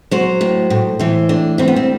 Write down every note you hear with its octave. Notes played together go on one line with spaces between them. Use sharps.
F#3 C5
A2
A2
E3 C5
A2 D4
G3 C4
B3
C4